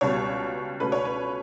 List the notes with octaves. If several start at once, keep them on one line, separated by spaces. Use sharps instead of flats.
C#2 B2 G3 B3 C#5
C#2 B2 A3 C#4 B4
C#5
B4